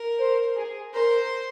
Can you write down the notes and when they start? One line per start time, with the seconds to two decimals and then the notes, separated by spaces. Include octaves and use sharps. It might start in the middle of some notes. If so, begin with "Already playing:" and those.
Already playing: A#4
0.19 C5
0.56 G#4
0.93 A#4 C5